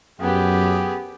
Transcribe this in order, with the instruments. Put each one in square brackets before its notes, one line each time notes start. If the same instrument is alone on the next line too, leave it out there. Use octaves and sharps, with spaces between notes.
[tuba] F#2 [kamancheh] B3 G4 [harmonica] G#4 G5